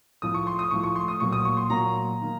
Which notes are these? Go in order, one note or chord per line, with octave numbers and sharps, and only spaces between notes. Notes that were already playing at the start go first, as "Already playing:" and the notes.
A2 F3 A3 D#6
C#6
C6
D#6
A2 F3 A3 C#6
C#6
C6
D#6
A#2 F#3 A#3 C#6
D#6
C#6
C6
A#2 F#3 A#3 A#5
D#3 A#3